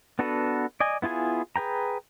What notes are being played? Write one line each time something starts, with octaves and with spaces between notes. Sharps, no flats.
B3 D4 F#4 A4 B4
D5 D#5 G#5
B3 E4 F4 G#4 G#5
G#4 B4 G5 A#5